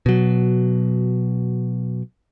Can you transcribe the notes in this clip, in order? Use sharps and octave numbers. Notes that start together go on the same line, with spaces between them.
B2 F#3